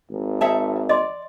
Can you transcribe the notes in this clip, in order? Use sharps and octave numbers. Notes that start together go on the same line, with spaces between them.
G#1
D#4 E5 A5
D5 D#5 C6